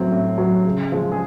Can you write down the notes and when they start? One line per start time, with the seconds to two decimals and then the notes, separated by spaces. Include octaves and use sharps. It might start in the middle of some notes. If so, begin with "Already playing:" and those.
Already playing: A2 F#3 C4
0.11 A2
0.38 F#3
0.66 C#3
0.92 F3 G#3
1.12 G#4